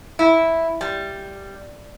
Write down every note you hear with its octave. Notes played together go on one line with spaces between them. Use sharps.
E4
G3